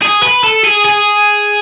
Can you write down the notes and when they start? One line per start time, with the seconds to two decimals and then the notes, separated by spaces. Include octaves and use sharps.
0.02 G#4
0.23 B4
0.44 A4
0.64 G#4
0.85 G#4